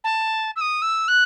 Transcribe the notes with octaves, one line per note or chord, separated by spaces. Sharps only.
A5
E6
D#6
E6
F#6